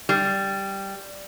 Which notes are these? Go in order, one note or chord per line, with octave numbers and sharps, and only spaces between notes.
G3